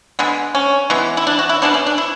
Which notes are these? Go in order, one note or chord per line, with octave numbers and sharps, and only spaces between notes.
D3 G#3 B3
C#4
E3 G#3 B3
E4
D4
F#4
E4
B2 G#3 B3 D4
C#4
D4
E4